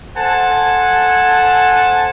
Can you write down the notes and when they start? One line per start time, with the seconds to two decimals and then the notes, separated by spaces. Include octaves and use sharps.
0.17 A4 C5 F#5 G#5 A5